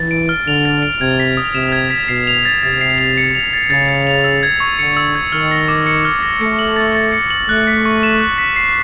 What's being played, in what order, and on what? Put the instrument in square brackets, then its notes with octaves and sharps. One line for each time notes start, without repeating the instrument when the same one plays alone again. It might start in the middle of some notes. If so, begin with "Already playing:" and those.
Already playing: [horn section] E3 [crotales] A6
[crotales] D7
F6
[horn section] D3 [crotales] F7
[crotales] A6
D7
[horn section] C3 [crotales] G#6
[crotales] B6
D#6
[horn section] C3 [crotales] E7
[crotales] G#6
B6
[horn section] B2 [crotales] C7
[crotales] F7
A6
[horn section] C3 [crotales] A6
[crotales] C7
F7
C#7
F7
A6
[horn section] C#3 [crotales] A6
[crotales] C#7
F7
E6
G#6
C#6
[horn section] D3 [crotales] C#7
[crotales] E6
G#6
[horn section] D#3 [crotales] F6
[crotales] A#6
D6
C#7
F6
A#6
[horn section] A3 [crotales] C#7
[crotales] F#7
A6
A6
C#7
F#7
[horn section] A3 [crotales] F#6
[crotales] B6
C#6
E7
F#6
B6
C7